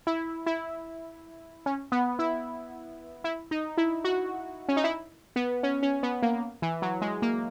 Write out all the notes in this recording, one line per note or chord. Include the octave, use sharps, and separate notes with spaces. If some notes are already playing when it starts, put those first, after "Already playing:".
E4
E4
C#4
B3
E4
E4
D#4
E4
F#4
C#4
D#4
E4
B3
C#4
C#4
B3
A#3
E3
F#3
G#3
A#3